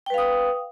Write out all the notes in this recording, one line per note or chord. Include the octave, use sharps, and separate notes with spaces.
B4 F5 G5 D#6